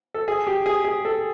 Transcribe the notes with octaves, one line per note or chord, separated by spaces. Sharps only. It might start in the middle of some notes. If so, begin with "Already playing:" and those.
A4
G#4
G4
G#4
G#4
A4